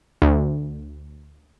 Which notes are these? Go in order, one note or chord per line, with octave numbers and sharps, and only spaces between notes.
D2